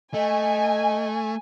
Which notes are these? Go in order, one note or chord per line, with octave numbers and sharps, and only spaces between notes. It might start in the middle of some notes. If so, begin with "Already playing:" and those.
A3 D#5 G#5